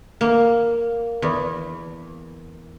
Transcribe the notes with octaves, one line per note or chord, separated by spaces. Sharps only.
A#3
E2